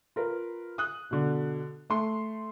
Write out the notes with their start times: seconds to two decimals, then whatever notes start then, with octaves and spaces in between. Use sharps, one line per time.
0.16 F4 A#4 B4
0.78 D#6 F#6
1.11 B2 D3
1.90 A3 C6